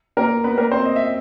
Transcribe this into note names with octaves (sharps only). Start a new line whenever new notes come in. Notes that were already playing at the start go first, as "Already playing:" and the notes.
A#3 A#4
B3 B4
A#3 A#4
C4 C5
D#5
E5